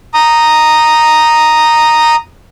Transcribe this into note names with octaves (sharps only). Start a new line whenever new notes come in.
A#5 D#6